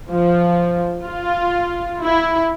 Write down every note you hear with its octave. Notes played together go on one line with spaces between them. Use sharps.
F3
F4
E4